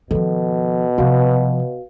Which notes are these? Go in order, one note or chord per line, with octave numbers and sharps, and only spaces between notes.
B2 D#3 F3 A4
C3 F3 F#4 B4 F5